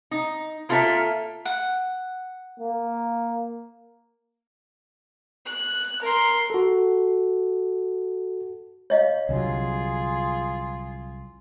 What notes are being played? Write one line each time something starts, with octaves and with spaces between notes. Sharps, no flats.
D#4
A#3 F4 A4 D5 E5 F5
F#5
A#3
F#6
A#4 C6
F#4 A4
C#5 D#5 F5
C2 D3 F#3 F4 G#4